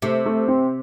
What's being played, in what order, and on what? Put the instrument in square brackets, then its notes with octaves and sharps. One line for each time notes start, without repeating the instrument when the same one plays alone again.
[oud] C3 [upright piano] A3
[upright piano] A3
C4